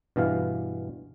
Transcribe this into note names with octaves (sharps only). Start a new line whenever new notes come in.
G2 B2 E3 F5